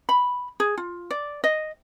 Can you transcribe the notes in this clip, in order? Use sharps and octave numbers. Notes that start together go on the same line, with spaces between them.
B5
G#4
F4
D5
D#5